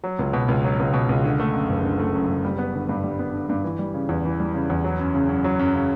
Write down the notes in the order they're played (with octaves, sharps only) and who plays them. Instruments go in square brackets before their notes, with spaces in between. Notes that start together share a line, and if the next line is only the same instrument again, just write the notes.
[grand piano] F#3
C#2
B2
C#2
F#3
C#2
B2
C#2
D3
A3
F#2
F#1
D3
A3
F#2
F#1
G3
B3
D3
G2
G3
B3
D3
G2
E3
G3
C#3
E2
E3
G3
C#3
E2
F#3
F#2
C#3
F#2
F#3
F#2
C#3